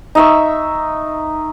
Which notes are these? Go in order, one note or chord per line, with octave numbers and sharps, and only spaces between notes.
D#4 E5 C#6